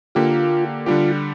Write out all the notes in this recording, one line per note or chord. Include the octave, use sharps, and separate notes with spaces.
D3 A#3 F4 G4
D3 G3 D4 F4 G4